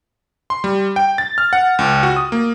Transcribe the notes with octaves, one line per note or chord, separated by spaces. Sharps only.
C6
G3
G5
A6
F6
F#5
C#2
F#4
D#6
A#3